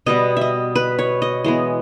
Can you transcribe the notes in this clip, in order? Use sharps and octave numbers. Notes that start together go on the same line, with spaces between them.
B2 G3 B3 D#5
D#5 E5
B4
C#5
D#5
E3 G#3 B3 D#5